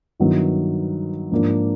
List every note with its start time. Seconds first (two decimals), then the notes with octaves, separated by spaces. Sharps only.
0.20 G2 D#3 F#3 B3 E4
1.32 G#2 F3 A#3 D4